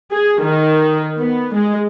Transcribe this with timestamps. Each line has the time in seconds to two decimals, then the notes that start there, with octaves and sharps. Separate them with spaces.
0.12 G#4
0.43 D#3
1.18 B3
1.54 G#3